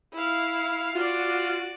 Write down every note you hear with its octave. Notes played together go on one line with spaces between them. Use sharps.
E4 F5
F4 F#4 D5